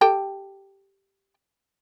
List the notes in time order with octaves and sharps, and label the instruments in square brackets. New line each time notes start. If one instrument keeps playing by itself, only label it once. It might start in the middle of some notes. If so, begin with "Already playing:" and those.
[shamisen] G4 A4 G5